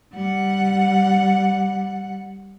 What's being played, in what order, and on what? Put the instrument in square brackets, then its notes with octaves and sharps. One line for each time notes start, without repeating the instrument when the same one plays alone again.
[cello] G3 F#5